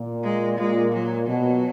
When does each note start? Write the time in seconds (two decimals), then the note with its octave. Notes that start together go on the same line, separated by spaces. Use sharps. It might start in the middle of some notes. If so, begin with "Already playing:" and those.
Already playing: A#2
0.23 G#3
0.58 A#2 G#3
0.93 F#3
1.27 B2 F#3